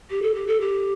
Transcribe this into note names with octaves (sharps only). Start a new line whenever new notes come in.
G4
A4
G4
A4
G4